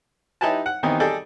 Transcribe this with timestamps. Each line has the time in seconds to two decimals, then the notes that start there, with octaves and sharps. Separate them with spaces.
0.41 D#4 E4 G4 B4 G#5 A5
0.66 F#5
0.83 D#3 E3 B3 C4 D#4 G4
1.00 G3 G#4 A4 D5 D#5 G5